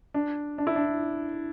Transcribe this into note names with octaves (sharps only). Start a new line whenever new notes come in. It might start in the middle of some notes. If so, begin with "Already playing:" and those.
D4
D4
E4
D4